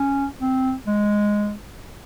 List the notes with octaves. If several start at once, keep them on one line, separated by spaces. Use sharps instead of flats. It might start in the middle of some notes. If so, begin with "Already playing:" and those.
Already playing: C#4
C4
G#3